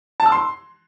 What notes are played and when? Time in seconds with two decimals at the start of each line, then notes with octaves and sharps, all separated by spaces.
0.20 A5
0.26 E6
0.32 C6